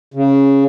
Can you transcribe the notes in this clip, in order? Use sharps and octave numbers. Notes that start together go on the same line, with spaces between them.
C#3